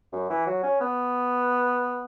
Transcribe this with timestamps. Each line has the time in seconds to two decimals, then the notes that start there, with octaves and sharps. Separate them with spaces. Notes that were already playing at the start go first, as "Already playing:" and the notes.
0.12 F#2
0.30 E3
0.46 F#3
0.63 C#4
0.81 B3